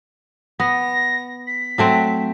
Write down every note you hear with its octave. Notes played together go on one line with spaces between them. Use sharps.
B3 A#6
B6
F#3 A3 C4